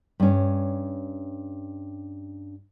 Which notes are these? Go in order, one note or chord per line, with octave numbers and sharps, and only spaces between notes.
G2 C#4